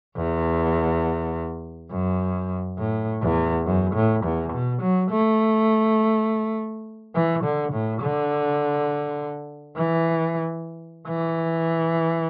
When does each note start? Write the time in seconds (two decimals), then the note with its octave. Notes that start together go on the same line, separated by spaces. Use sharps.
0.17 E2
1.91 F#2
2.79 A2
3.22 E2
3.66 F#2
3.95 A2
4.25 E2
4.53 B2
4.82 F#3
5.11 A3
7.16 E3
7.44 D3
7.73 A2
8.02 D3
9.77 E3
11.08 E3